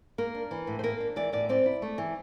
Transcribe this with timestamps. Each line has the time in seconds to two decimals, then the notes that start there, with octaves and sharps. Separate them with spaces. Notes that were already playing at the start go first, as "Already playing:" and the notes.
0.18 A#3 A#4
0.35 D4
0.51 E3
0.67 A2
0.79 C5
0.83 A#3 A#4
1.00 D4
1.16 E3 D5
1.33 A2 D5
1.49 C4 D5
1.66 E4
1.82 A3
1.98 E3